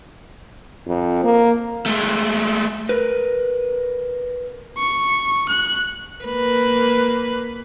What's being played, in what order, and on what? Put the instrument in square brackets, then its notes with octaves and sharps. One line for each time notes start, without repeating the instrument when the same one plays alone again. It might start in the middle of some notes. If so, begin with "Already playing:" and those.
[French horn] F2
A#3
[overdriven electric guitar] G#3 A3
[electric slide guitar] A#4 B4
[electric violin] C#6
F#6
[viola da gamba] A#3 B4